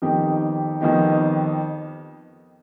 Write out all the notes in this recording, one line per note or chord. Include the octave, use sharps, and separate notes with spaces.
F2 D#3 B3 D#4 G4
F2 D#3 B3 D#4 G4